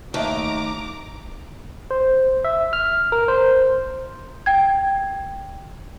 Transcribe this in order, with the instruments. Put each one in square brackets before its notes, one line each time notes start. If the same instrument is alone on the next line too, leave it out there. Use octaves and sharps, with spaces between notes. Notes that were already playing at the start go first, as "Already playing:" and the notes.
[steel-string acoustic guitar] D#2 [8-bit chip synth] A3 D#4 [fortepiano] D#5 E5 A5 [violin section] A#5 D6
[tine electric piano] C5
E5
F6
A#4
C5
[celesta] G5 G#6